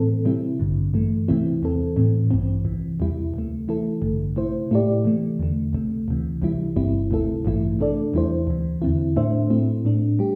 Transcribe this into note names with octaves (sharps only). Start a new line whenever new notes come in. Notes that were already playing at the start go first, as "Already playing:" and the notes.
Already playing: A2 E3 C4 A4
C3 G3 C4 E4
A1 G2 D3
G2 E3 A3
C2 C3 E3 C4 E4
E2 E3 C4 A4
A2 E3 C4
A1 G2 E3 C4
C2 C3 E3
E2 C3 G3 E4
D2 C3 A3
E3 A3 E4 A4
A1 G2 D3
C3 A3 E4 C5
A2 A3 E4 G4 D5
C3 E3 A3
E2 D3 A3
C2 C3 A3
D2 C3 E3
C2 C3 E3 G3 E4
G1 G2 G3 C4 E4
D2 C3 A3 E4 A4
A1 G2 E3 A3 E4
C3 A3 D4 A4 D5
E2 E3 G3 E4 C5
D2 C3 E3
E2 D3 C4 E4
A2 A3 D4 C5 E5
A2 A3 C4 E4
A2 A3 D4
G3 G4